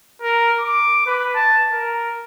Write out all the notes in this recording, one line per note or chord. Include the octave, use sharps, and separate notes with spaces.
A#4
D6
B4
A5
A#4